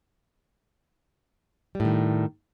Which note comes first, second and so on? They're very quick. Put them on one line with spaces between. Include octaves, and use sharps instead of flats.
G3 A2 D#3